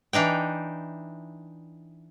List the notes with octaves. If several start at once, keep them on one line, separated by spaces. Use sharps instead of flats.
E3 D4 D#4 G5